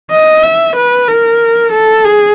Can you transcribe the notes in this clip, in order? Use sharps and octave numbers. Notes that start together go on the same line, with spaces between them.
D#5
E5
B4
A#4
A4
G#4